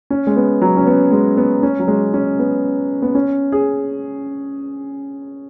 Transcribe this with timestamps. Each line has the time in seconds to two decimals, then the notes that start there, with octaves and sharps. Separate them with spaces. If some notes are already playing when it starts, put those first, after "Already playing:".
0.10 C#4
0.27 G#3
0.36 B3
0.62 F#3
0.77 C#4
0.87 B3
1.12 G#3
1.37 B3
1.63 C#4
1.79 F#3
1.88 G#3
2.14 C#4
2.39 B3
3.02 B3
3.15 C#4
3.52 G#4